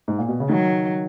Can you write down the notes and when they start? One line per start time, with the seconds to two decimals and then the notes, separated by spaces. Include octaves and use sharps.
0.08 G#2
0.18 A#2
0.28 B2
0.40 C#3
0.49 D#3 F#3